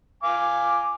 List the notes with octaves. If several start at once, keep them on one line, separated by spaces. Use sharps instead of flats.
F5 G#5 D6